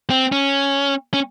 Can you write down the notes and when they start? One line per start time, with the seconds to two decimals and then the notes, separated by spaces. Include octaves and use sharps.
0.10 C4
0.32 C#4
1.14 C#4